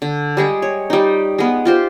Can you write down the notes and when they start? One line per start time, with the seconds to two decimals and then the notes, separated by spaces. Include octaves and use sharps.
0.02 D3
0.37 G3 G#3 G#4
0.62 C#5
0.90 G3 D#4
1.38 G#3 B3
1.65 F4 G4 C5